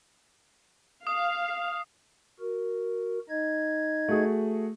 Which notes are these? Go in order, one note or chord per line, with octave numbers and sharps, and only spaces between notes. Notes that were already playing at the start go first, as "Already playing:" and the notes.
F5 D#6
F#4 A#4
D#4 D#5 G#6
A3 F#4 G#4